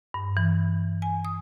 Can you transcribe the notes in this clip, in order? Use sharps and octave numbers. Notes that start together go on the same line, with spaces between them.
G2
E3
G#5
D#6